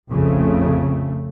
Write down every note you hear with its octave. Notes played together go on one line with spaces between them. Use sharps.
F1 A#1 F2 C#3 A3